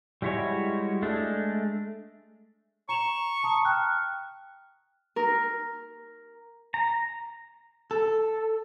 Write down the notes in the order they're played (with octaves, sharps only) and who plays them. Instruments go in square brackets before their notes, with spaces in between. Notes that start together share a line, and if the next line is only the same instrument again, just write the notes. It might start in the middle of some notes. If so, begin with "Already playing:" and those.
[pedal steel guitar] G3 G#3 E4 F#4 C#5
G#3 A3 D4
[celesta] A#5 E7 F7 [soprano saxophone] C#6
[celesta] E7
A5 A#5 D#6
G5 F6 F#6
[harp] A#4
[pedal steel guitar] A#5
[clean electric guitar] A4